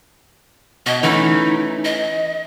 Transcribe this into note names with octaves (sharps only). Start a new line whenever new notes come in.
B2 D#5
E3 A3 C#4 D#4
D#5